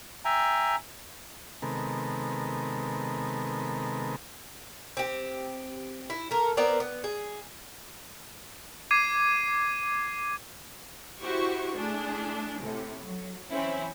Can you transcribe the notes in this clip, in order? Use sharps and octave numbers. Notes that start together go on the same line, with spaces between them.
E5 G5 G#5 A#5
C3 D#3 G#3 B3 A4 A#4
C4 G4
E4
A3 A#4
B3 C4 A#4 D5
B3
G#4
D6 G#6 C7 D#7
E4 F#4 G4 C5 C#6
A3 D4 E4 G#4
A2 C3
F#3
E3 C4 C#4 E4